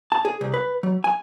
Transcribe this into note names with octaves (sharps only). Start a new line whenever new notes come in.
A5
G#4
C2
B4
F#3
G#5